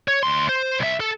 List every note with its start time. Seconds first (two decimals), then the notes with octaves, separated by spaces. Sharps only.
0.08 C#5
0.23 D2 C6
0.49 C5
0.80 C2 E5
1.00 A4